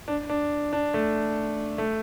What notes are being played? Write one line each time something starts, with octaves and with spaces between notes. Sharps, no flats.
D4
D4
D4
A3
A3